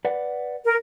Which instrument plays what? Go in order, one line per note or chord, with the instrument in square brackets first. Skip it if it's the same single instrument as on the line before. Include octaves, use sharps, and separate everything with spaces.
[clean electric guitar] B4 D5 F#5
[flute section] A#4